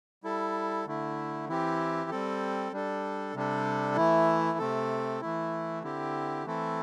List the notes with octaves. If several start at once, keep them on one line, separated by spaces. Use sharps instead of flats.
G3 E4 A4
D3 A3 E4
E3 C4 E4 G4
G3 C4 A4
G3 D4 A4
C3 G3 D4 A4
E3 A3 E4
C3 A3 C4 A4
E3 A3 E4
D3 C4 E4 G4
E3 A3 C4 E4 A4